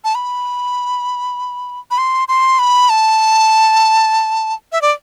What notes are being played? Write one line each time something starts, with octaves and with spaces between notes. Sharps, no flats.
A5
B5
B5
C6
C6
B5
A5
E5
D5